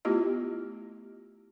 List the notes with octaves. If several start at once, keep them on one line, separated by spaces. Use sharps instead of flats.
A3 B3 E4 F4 G4 D#5